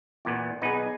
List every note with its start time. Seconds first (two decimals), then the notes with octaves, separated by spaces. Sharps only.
0.25 E2 A#2 B3 D5
0.62 B1 B3 D#4 G#4 B4